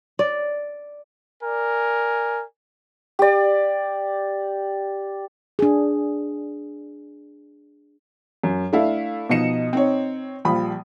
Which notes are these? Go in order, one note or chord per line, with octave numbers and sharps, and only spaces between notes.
D5
A#4 D5 G#5
G4 D5
D4 G#4
F#2
A3 D4 E4 A4 F5
B2 F3 D#4 D#5 C#7 E7
C4 D#4 C#5
A#1 F3 G3 B5 D#6